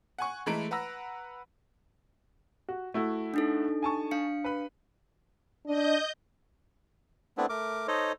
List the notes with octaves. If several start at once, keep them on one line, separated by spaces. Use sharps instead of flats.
F#5 G#5 C#6
E3 G#3 A3 E4 A#5 D7
B4 F#5 A#5 E6 A#6
F#4
A3 E4 F#4
D4 D#4 A4
G#5 A5 C#6
D4 F5 C#7
B4 B5
D4 D#5 G6
A3 B3 C4 D4 E4
A3 A#4 D6
D#4 A4 C5 C#5 D#5